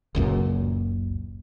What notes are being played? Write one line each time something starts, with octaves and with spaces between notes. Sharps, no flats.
F#1 C#2 F#2 A#2